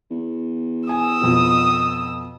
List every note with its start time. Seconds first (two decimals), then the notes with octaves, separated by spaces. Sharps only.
0.11 E2
0.89 G#5 D#6 E6
1.21 F2 B2